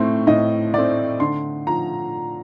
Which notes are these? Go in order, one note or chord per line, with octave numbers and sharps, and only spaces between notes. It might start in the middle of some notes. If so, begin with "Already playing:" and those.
Already playing: A2 A3 C4 C6
A2 D#5
A3 C4 D5
D3 C6
F3 A#5